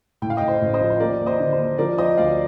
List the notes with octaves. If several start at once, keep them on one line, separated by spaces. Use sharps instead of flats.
A2 G5
F5
A2 D#5 G5
C5
A1
C5 D#5
F3
C5
D#2 A#4 D5
D#2
C5 D#5
D3
C5
D#2
F3 A#4 D5
F3 C5 D#5
D2 D5 F5